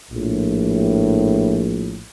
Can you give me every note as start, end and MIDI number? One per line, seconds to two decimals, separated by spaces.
0.11 2.04 34
0.11 2.04 45